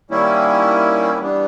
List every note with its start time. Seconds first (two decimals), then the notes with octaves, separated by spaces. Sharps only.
0.10 D#3 G3 A#3 C#4 E4
1.18 E3 G3 B3 D4